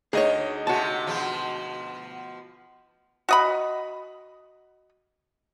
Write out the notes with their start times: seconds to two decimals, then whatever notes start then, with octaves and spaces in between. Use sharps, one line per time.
0.13 D2 D#4 G#4 C#5 D#5
0.67 C3 G#3 F#4 A5
1.07 B2 F3 F4
3.29 F#4 D#5 B5